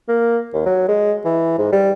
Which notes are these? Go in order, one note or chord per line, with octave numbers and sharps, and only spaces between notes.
A#3
D#2
F#3
G#3
E3
G#2
G3